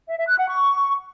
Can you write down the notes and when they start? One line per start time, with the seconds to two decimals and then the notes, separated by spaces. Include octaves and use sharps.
0.08 E5
0.18 E5
0.28 F#6
0.38 F#5
0.48 C#6